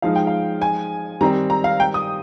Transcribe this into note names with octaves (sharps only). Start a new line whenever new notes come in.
F3 G#3 D#4 F5
G5
F5
G#5
D#3 G3 C4 D#4 G4 A#5
A#5
F5
G5
D#6